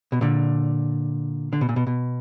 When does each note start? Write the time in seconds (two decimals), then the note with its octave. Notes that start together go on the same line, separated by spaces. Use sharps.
0.12 B2
0.21 A#2 D3
1.53 D3
1.61 B2
1.69 A#2
1.76 B2
1.87 B2